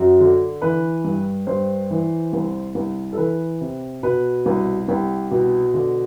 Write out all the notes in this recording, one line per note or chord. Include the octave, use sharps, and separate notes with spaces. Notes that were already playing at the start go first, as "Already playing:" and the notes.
Already playing: F#2 F#4
D3
E3 B4
G2
G2 C5
E3
C2
C2
A4
E3 B4
C3
B2 B4
C2
C2 G4
B2
D3